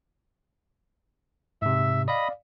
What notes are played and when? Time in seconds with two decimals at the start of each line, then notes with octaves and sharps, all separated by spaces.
1.62 G#2 C3 E5
2.08 D5 D#5 F5 B5 D#6